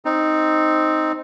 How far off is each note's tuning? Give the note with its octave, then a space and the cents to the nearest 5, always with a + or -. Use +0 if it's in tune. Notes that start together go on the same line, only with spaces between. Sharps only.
C4 +0 D#4 +0